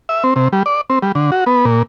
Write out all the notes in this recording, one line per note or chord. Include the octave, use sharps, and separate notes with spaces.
E5
C4
C3
G3
D5
C4
G3
D3
F#4
B3
A#2